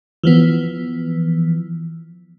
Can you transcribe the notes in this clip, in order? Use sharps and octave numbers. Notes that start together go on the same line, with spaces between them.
E3 F3 B3